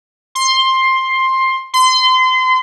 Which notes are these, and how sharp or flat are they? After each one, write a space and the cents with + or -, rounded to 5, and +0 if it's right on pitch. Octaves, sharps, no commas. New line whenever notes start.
C6 +10
C6 -30